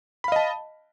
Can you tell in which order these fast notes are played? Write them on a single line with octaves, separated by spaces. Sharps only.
B5 F5 D#5 A5